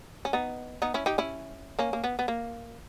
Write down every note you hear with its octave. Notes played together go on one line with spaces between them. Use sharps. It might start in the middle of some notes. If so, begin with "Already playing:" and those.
C#4
B3 D#4
B3 D#4
C#4 E4
D#4 G4
C#4 E4
A#3 C#4
A#3
B3
B3
A#3